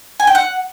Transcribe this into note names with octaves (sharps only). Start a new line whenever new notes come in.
G#5
G5
F#5